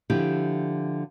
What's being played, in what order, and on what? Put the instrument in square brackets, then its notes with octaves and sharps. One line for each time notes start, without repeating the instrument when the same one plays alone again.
[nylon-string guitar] D3 F3 E4 G4